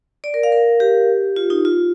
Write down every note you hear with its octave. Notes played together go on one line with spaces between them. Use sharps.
D5
A#4
F5
A#4
G4
F4
D#4
F4